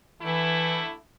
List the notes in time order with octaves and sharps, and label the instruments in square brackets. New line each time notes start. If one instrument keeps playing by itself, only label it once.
[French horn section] D3 A3 E4 [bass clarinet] E3